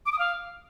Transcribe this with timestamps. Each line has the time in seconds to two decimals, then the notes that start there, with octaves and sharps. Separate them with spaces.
0.06 D6
0.12 D#6
0.19 F5